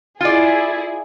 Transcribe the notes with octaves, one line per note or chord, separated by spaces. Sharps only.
E4 F4 G#4 D5